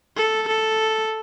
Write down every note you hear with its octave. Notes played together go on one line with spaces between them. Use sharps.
A4
A4